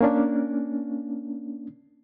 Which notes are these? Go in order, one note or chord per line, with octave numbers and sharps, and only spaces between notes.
A#3 C#4 D4